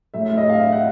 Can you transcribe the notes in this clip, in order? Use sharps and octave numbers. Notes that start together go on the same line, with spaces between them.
A2 F#3 A3 E5
E5
D#5
F5
E5
F#5